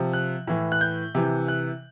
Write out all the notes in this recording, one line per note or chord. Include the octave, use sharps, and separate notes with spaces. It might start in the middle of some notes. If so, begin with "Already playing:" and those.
Already playing: C3 F3
F#6
A2 E3
F#6
G6
C3 E3
F#6